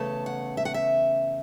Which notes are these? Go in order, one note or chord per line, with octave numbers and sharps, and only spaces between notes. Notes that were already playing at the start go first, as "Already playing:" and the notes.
Already playing: E2 C#3 A3 A5
F#5
E5
F#5
E5